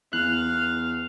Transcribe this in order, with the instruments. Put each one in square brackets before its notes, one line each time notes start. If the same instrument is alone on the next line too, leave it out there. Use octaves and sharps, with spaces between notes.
[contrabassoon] E2 [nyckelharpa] F5 [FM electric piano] F#6